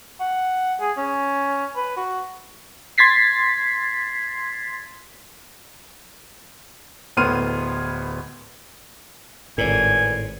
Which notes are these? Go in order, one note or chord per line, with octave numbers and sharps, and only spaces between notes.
F#5
G#4
C#4
B4
F#4
C6 G#6 A6 B6 C7
D1 A2 B3 C6 F6 D#7
G#1 A2 A#4 B4 D5 G#5